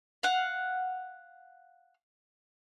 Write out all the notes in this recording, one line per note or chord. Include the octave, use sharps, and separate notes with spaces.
F5 F#5